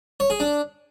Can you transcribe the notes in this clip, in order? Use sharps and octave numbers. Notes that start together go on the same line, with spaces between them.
C#5
G#4
D4